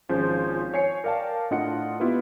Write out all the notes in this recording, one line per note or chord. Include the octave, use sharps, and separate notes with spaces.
G#1 F3 C#4 G#4 C5 G6
C#5 G#5 C7 C#7
A#4 D5 F5 G5 A5
A2 D4 F4 D#5 F#5 C#7
B3 E4 F4 G4 B4